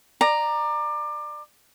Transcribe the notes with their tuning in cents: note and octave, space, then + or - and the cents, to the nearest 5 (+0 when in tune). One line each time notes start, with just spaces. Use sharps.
D5 +25 A#5 +0